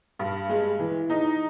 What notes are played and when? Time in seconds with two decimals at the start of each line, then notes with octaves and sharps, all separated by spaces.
0.19 G2
0.49 G#3
0.79 E3
1.10 D#4